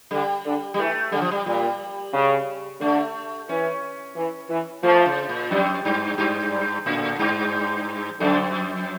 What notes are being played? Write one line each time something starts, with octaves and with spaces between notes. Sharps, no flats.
D3 G3
D3
G3
E3 A3
D3 G3
F3
G3
A#2 G3
C#3
D3 A3
E3 C#4
E3
E3
F3 A3
C#3
A#2
F2 G3
G2 G3
G2 G3
G3
A2 D3
G2
F2 D3